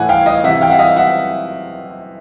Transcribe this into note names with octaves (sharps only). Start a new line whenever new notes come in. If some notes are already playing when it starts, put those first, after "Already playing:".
Already playing: A2 E3 F#5 G#5
F5 G5
D#5 F5
C3 E3 E5 F#5
F5 G5
E5 F#5
D#5 F5
E5 F#5